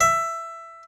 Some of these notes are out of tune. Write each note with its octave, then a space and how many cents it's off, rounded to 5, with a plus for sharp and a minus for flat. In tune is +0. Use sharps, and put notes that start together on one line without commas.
E5 +10